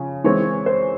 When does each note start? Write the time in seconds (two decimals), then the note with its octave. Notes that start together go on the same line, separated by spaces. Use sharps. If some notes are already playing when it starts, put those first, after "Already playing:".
Already playing: C#3 F3 C#4
0.24 E3 G#3 C4 C#5
0.66 C5